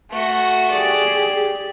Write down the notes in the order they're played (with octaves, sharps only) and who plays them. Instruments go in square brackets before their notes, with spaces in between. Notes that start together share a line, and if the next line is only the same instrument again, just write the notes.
[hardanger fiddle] A3 F#4
[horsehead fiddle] G4 G#4 [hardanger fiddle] D5